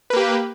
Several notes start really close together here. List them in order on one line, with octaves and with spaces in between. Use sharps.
B4 A#3 G4